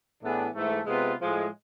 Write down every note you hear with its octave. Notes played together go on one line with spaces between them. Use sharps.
A2 E3 B3 D4 G#4
G#2 E3 A3
C3 G#3 B3 F4 B4
A2 F3 G#3